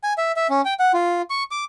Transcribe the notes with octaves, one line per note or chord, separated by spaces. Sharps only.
G#5
E5
E5
C#4
G5
F#5
F4
C#6
D6